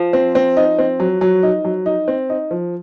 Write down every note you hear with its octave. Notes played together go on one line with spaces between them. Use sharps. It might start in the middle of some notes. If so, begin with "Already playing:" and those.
Already playing: F3
C4
C4
D#4
C4
F#3
F#3
D#4
F#3
D#4
C4
D#4
F3